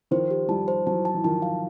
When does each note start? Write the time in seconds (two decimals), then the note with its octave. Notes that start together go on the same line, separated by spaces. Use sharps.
0.11 D#3 F3 C5
0.31 G4
0.48 F3 G3 A5
0.68 C5
0.86 E3 F#3 A5
1.05 A5
1.14 E3
1.24 D#3 F3 A5
1.42 F5